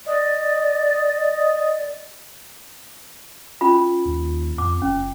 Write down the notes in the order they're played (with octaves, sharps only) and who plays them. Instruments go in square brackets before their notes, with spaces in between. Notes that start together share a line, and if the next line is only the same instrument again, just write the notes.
[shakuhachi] D5 [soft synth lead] D#5
[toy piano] C#4 F4 B5
[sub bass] D#2
[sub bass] F2 [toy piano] D6
[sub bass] F#1 [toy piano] C#4